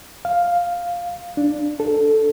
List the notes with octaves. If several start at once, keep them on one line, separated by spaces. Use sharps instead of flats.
F5
D4
A4